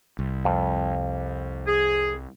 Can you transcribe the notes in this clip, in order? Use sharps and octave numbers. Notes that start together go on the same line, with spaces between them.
C2
F2
G#4